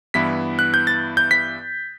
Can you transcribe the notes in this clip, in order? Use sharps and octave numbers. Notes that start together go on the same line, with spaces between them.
G2 E3 B3 E4 B6
F#6
G6
A6
G6
B6